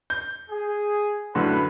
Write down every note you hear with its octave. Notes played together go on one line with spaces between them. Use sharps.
G6
G#4
F#2 A2 D3 B4